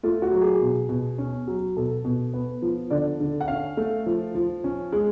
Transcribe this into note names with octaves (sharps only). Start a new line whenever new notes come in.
A3 F4
F#4
F#3
G#4
B2
B2
C#4
F#3
B2 A4
B2
B3
F3
D3 D5
D3
F#5
C#4 F5
A3
F3
F3
C#4
G#3